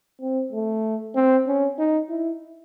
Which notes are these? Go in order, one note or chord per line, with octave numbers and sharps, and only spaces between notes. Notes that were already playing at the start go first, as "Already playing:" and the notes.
C4
A3
C4
C#4
D#4
E4